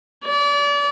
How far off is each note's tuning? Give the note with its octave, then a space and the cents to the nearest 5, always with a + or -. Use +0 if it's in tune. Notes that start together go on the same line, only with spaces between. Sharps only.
D5 -35